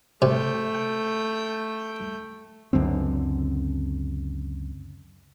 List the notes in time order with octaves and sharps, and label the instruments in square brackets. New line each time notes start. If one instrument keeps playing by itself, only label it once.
[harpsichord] C3 [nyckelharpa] A3 G5
[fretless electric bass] C#2 F#2 D3 C4